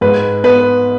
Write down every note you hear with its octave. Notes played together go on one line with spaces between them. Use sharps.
G#2 B4
B3 B4